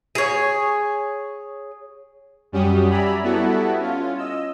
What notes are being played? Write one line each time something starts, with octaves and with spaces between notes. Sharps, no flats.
G#4 C#5
F#2 G3 C#4 F#4 G4 D#6
D5 E5 G#5 A#5 B5
G3 B3 E4 F#4 A4
C#4 F4
D#5 E6